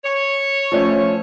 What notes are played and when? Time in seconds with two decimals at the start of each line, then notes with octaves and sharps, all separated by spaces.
0.03 C#5
0.72 F3 A3 C#4